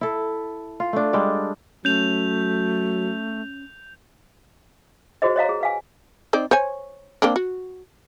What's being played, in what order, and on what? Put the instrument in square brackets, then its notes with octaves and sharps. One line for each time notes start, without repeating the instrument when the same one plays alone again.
[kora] E4 A4
F4
A3 D4
G3 G#3 A4 D5
[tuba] F#3 [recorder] A3 [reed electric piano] C#4 [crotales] G6 F7
[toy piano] F#4 G#4 C5 D#5
C#5 D#5 F5 A#5
G#4
B4 F5 G#5
[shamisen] C4 D#4 D5
C5 C#5 G#5
A#3 C4 D4
F#4